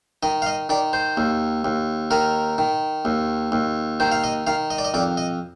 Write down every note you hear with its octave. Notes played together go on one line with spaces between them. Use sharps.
D#3 D#5
F5
D#5
D#3 D5
C5
D#2
D#2
D#3 A#4
D#3
D#2
D#2
D#3 C5
F5
D#5
D#3 F5
D#5
D5
D#5
F2 D5
D#5